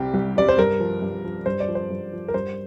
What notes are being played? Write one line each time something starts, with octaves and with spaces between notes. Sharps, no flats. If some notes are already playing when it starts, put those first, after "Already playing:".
Already playing: C2 C3 G3 G4
C2
C3 G3 D5
C5
G2 A#4
F3
G2
F3
G2 C5
D5
F3
C5
G2
F3
A#4
G2 C5